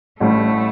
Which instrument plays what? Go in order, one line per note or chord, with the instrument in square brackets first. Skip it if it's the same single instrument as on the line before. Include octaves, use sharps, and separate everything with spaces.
[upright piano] A1 A2 G3 [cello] A3